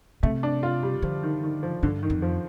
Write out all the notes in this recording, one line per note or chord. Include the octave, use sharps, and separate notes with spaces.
C3 A3
D4
F4
G3
D3 F3
D#3
D#3
F3
G2 D3
D#3
F2
F3